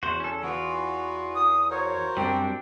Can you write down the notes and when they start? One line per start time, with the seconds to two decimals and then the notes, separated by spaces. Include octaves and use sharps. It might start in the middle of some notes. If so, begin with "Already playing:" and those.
0.03 E2 F#4 C5
0.20 C#4 A4
0.43 E3 B3 F4 F#4
1.35 D#6
1.70 F#4 A#4 C5 C#5
2.17 F#2 G3 C4 D4 G5